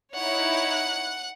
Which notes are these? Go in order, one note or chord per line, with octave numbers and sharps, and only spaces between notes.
D#4 E4 C#5 F#5 F#6